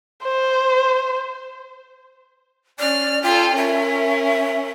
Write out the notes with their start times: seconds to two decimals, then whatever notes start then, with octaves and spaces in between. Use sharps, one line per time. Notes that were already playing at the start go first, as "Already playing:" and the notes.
0.24 C5
2.79 C#4 D5 F6
3.23 F4 A4 G5
3.57 C#4 A#4 E5